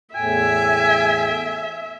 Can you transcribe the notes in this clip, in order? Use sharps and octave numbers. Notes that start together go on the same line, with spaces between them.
E2 A2 E5 G5 G#5